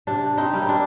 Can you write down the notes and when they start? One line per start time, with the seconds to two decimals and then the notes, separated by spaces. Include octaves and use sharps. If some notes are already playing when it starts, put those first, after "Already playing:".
0.07 C3 D4
0.37 C4 D#4
0.53 G3 A#3
0.62 C4
0.69 D4